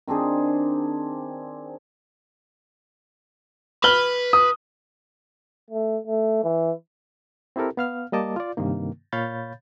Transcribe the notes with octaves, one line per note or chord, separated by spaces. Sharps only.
D#3 C4 D4 G#4
B4 F6 F#7 G7
D#6
A3
A3
E3
C4 E4 G4 A4 A#4
B3 F5 F6
G3 A#3 D#5 A5 D6
F4 D5
G2 C3 D#3 A#3
A#2 C#5 F5 B5 G6 A6